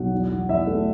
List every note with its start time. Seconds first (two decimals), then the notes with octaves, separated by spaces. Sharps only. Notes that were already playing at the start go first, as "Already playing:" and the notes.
Already playing: B1 F#5
0.12 E2
0.30 E2
0.49 E2 E5
0.67 A3